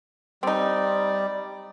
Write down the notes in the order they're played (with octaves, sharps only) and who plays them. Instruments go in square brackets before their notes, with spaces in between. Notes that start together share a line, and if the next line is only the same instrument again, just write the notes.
[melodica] G3 D5 [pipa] C4 D#4